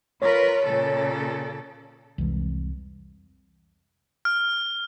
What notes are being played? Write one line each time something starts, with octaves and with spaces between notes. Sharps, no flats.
F4 A#4 B4 C#5
A#2 C#3 A4
C2 F2 E3 G#3
F6